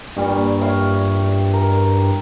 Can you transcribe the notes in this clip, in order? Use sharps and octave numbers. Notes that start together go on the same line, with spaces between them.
G2 A#2 G3 C#6
E4 C#5 F5
A#4 A#5